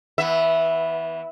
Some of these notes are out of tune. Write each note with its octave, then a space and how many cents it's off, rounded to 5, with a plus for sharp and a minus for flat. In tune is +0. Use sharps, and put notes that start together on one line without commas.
E3 -25 B3 +0 E5 +0